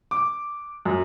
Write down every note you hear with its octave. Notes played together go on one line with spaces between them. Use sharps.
D6
F#2